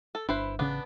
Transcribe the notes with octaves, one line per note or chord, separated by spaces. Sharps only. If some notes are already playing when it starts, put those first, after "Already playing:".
A4
G1 D4 E4 B4 C5
A1 C#3 B3 C#4 D4